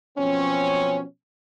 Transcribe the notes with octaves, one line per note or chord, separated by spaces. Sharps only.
B2 F3 F#3 C4 C#4